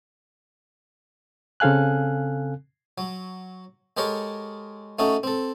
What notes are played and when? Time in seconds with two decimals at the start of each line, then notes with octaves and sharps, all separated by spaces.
1.60 C#3 C4 A4 F5 G#5 F#6
2.98 F#3
3.97 G#3 G4 A4 A#4 C#5
4.99 A3 C#4 D#4 F#4 A4
5.23 C4 A4